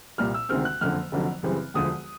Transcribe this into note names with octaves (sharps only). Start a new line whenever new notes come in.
C2 A#2 G3 F6
E6
D2 C3 D#3 G#3 C4 F6
F#6
F#1 F2 D3 F6
F1 F2 D3 F#3
F#2 C#3 E3 G3 C4
E1 D2 D3 F3 D#6